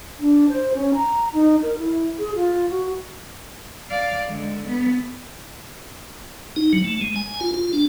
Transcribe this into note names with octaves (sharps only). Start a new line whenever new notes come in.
D4
C5
C#4
A#5
D#4
A#4
E4
G#4
F4
F#4
D5 F5
D3 G#3
B3
D#4
F#3
A3
G#3
G#5
F4
F4
D4